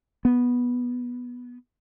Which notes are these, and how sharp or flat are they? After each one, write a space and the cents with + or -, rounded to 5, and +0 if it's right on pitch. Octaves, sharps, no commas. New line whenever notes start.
B3 -10